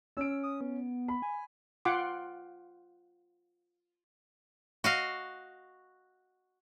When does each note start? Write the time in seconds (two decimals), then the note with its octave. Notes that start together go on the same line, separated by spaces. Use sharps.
0.17 C#4 E6 D7
0.43 D#6
0.61 B3
1.08 B5
1.22 G#5
1.85 F4 F#5 G5 C6 D6
4.84 F#4 D#5 F5